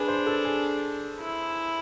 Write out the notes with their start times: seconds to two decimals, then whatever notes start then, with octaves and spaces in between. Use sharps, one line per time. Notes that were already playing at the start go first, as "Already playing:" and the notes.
Already playing: D4 G#4 B4
0.08 C5
0.27 A4
0.45 G#4
1.20 E4